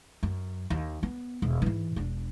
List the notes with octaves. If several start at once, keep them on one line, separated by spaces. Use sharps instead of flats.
F#2
D#2
B3
E1
G#2 E3
E1 D4